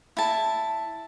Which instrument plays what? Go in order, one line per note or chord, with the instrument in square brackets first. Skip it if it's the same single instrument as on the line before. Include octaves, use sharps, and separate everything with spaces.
[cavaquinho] E4 A5